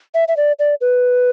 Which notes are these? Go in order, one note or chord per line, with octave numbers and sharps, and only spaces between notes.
E5
E5
D5
D5
B4